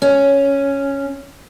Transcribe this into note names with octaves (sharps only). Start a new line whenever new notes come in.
C#4